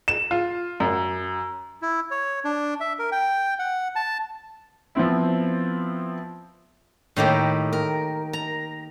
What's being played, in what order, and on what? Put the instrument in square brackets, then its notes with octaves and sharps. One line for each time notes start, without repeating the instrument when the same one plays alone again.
[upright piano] E7
F4
F#2
[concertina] E4
C#5
D4
E5
A#4
G5
F#5
A5
[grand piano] F3 B3 C4 E4
[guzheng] A2 D#3 A#3 G4
A#4
A#5